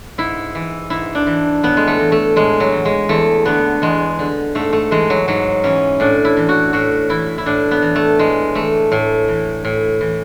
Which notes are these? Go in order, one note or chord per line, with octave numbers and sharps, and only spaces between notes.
G#2 E4
E3
G#2 E4
D4
E3
A2 B3
G#3
A3
E3
A3
A2 G#3
F#3
E3
G#3
E2 A3
D3 B3
E2 G#3
D3
G#2 A3
A3
E3 G#3
F#3
G#2 F#3
E3 C#4
A2 D4
E4
E3
F#4
A2 F#4
E3 E4
E4
A2 D4
B3
E3
A3
A2 G#3
E3 A3
A2
E3
A2
E3